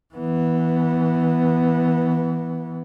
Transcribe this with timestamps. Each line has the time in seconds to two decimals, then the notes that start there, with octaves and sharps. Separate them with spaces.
0.15 E3 B3